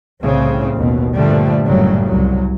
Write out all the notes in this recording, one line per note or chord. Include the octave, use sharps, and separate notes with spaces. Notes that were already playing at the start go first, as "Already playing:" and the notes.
C2 A2 C#3 C4
A1 D#2 B2
G2 A#2 D3 F3 G3 A3
F#1 F#2 A2 C#3 F#3 G3
C2 F#3